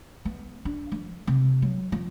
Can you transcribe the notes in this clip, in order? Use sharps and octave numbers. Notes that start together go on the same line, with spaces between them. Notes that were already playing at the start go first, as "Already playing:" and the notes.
B3
D4
F3
C3
F#3
F3